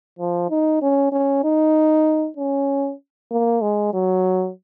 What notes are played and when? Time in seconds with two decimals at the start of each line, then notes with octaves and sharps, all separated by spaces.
0.19 F3
0.50 D#4
0.82 C#4
1.12 C#4
1.44 D#4
2.37 C#4
3.31 A#3
3.62 G#3
3.94 F#3